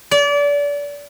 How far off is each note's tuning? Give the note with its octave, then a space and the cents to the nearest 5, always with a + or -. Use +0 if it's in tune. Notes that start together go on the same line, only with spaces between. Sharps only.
D5 -30